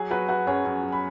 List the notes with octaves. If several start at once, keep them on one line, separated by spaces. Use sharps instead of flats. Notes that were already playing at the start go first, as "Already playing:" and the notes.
Already playing: F#3 G#4
F#3 F#4 B4
F#3 F#4 B4
F#2 G#4 C#5
F#2
F#3
B5